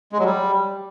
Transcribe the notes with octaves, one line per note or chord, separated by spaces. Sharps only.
G#3
F#3
G3